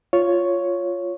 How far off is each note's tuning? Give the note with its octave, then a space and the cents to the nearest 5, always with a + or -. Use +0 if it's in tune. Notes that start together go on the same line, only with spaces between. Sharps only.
F4 +0 C#5 +5